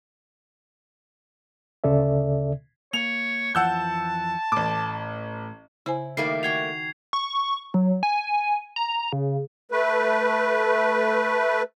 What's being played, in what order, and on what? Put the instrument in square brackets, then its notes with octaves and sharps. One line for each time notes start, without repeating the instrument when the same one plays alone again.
[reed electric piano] D2 C#3 A4 D5 E5
[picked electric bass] A#3 [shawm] C#5 [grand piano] F7
[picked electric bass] F2 E3 F3 [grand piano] F#5 E6 G6 [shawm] A5
[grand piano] A1 D6 [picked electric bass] A2
[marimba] C#3 C5 G#5 [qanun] E4
[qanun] D#3 [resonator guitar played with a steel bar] G3 A3 A#3 [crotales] C7
[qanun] F#4 G5 C#6 [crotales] G#6 C7 F7
[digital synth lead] C#6
F#3
G#5
A#5
C#3
[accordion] A3 B4